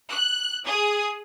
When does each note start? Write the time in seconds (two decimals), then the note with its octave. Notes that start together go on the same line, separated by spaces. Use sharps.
0.11 F#6
0.66 G#4 D#6